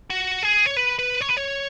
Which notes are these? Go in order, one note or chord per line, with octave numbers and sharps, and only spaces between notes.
F#4
G#4
C#5
B4
B4
C#5
B4
C#5